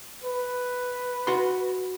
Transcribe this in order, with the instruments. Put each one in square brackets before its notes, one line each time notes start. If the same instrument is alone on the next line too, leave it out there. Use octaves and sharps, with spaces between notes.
[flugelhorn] B4
[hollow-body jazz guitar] F#4 C6